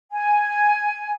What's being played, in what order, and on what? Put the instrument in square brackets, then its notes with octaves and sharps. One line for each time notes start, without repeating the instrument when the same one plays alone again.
[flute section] G#5